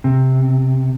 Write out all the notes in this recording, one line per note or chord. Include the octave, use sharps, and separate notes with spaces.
C3